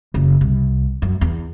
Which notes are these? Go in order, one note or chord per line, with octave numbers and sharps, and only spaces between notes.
F#1
C2
F#2
E2